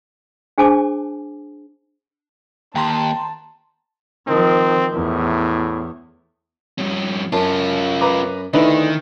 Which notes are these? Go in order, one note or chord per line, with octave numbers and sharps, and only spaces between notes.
D4 G#4 C5 G#5 A5 D6
D#2 G5 A5 A#5 C6
D#3 F3 C4
E2 A2
G2 C#4
F#2 C#4 F4 A5
B4 A#5 D6
D2 D#3 D#4 E4 B4